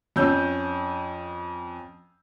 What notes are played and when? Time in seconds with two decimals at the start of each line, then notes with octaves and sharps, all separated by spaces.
0.16 F2 C#4 E6 G6